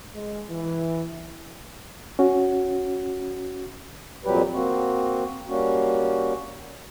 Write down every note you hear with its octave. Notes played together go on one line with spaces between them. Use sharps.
G#3
E3
C#4 F#4
F2 A#2 F#3 G3 G4 B4
A#3 C4 F#4
G3 A#3 C#4 F#4